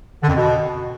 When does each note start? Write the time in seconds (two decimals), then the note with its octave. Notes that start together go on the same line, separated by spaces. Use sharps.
0.23 D3
0.29 F2
0.35 B2